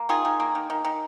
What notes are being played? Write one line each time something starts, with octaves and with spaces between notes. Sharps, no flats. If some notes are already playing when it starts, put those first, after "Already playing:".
Already playing: A#3
D#3 F4 G#4
D#3
A#3
D#3
D#3
D#3